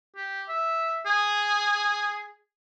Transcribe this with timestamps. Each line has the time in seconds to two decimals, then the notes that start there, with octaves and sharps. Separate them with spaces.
0.16 G4
0.49 E5
1.06 G#4